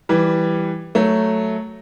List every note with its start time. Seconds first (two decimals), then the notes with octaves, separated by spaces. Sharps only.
0.09 E3 G3
0.95 F#3 A3